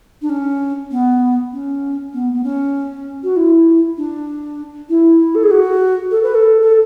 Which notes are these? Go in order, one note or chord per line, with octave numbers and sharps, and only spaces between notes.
D4
C#4
B3
C#4
B3
B3
C#4
F#4
E4
D4
E4
A4
G#4
F#4
A4
B4
A4
A4